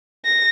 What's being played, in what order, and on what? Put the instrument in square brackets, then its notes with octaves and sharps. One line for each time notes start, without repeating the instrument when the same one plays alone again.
[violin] A#6